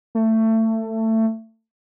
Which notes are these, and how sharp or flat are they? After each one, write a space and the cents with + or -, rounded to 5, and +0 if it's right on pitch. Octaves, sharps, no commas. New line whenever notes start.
A3 +20